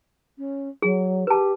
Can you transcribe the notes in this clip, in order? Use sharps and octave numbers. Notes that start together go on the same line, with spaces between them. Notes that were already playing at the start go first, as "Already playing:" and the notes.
C#4
F#3 G#4
G4 B4 A5